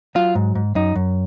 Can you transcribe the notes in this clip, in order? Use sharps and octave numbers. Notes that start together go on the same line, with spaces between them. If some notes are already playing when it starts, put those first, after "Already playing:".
F#3 F4
G#2
G#2
F#2 D#4
F#2